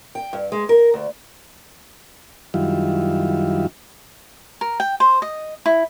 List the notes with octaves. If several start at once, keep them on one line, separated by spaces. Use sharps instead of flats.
G5
G2
G#3
A#4
D2
F#2 D#3 G3 E4 F4
A#4
G5
C5
D#5
E4